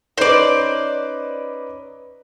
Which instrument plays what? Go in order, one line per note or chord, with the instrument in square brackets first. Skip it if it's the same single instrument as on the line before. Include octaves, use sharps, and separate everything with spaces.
[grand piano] C#4 D#4 B4 [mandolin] C5 D5